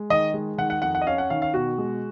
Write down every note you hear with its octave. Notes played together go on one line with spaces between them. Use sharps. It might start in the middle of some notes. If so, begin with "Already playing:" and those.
Already playing: G#3
D#3 D#5
G#3
D#3 F#5
F#5
F2 F#5
F#5
D#5
C#4 F5
F#5
D#3 F5
F5
B2 F#4
G#3